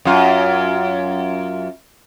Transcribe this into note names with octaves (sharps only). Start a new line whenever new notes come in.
F#2 F4